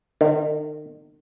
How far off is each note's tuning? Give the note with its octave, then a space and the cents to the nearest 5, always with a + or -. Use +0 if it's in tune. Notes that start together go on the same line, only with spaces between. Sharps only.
D#3 -40